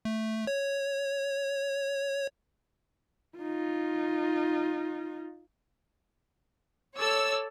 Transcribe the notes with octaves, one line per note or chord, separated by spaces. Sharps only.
A3
C#5
D#4 F4
A4 C#5 D5 E6